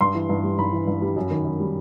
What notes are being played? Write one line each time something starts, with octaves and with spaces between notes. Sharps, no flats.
G2 C6
E3
G2
G3
G2 B5
E3
G2
G3
F#2
D#3
F#2
G3